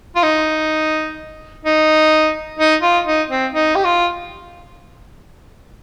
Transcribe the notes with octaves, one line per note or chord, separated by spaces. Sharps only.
F4
D#4
D#4
D#4
F4
D#4
C4
D#4
G4
F4